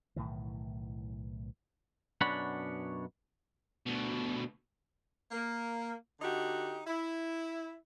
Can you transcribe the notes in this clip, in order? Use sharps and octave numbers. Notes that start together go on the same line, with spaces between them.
B1 A2 D#3 E3
F#2 B2 D4 C#5 F#5 B5
D2 B2
A#3
D3 D#4 F#4 G4
E4